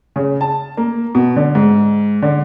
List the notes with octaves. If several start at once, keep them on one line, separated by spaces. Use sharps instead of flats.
C#3
A5
A#3
B2
D3
G#2
D3